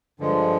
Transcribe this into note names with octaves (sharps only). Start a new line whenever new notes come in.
G2 D3 F3 G#3